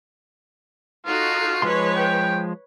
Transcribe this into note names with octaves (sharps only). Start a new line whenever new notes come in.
D#4 F4 F#4 A4
F3 G#3 B4 C#5 C6
G5